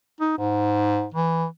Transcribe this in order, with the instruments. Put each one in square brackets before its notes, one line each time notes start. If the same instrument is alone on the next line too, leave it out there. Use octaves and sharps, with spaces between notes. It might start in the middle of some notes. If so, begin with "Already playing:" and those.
[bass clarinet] D#4
G#2
E3